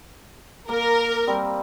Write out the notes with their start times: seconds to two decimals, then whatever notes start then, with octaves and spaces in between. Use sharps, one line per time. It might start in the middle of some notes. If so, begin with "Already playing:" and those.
0.69 A#3 A#4
1.27 G3 C4